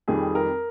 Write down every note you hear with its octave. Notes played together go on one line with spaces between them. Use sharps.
F2 D#3 G3 G#4
A#4